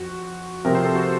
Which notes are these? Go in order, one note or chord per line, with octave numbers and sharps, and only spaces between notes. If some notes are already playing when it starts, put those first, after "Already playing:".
Already playing: F2 F#4
C3 F3 C4 F4 A#4
C5
A4
F#4